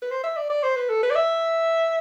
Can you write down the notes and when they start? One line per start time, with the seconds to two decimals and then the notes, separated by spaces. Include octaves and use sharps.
0.02 B4
0.11 C5
0.23 E5
0.36 D5
0.50 D5
0.63 C5
0.76 B4
0.89 A4
1.03 B4
1.10 D5
1.15 E5